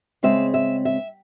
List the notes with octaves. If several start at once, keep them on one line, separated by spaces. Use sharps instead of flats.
C#3 G#3 C4 E5
E5
E5